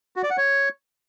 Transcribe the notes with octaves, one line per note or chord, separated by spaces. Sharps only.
F#4
D5
F#5
C#5